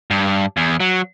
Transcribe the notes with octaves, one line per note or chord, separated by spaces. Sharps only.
G2
E2
F#3